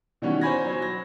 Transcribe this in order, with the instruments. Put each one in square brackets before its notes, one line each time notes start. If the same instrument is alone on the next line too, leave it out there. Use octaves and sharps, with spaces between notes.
[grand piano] B2 D#3 E3 G3 C#4 F#4
C5 C#5 G#5 B5 G#6 A#6
F#3 C5
A#6